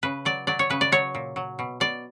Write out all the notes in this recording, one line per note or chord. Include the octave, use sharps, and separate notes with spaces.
C#3 B4
F#3 D5
F#3 D5
C#5
C#3 B4
D5
F#3 C#5
A#2
F#3
B2
B2 D5